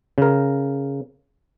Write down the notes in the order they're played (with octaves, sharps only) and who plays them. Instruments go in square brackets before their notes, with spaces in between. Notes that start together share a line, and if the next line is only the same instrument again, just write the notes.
[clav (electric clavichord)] C#3 A#4